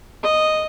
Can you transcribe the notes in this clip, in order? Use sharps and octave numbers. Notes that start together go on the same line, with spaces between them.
D#5